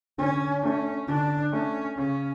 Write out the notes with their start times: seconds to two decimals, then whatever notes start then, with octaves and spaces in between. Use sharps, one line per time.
0.18 D3 C#4
0.63 A3 C#4 D4
1.08 D3 D4
1.53 A3 C#4 D4
1.98 C#3 C#4